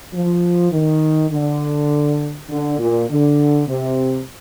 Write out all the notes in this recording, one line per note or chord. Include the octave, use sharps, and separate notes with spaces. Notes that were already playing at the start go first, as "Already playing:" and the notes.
F3
D#3
D3
D3
A#2
D3
C3